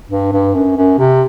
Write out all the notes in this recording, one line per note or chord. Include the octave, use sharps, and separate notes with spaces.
G2
G2
F#2
F#2
C3